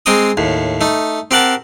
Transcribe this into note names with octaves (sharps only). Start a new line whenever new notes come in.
G#3 C4 G5 A#5 C#6 D#6
D#2 A2
A3 D#4
C4 G4 A#4 F#5 A5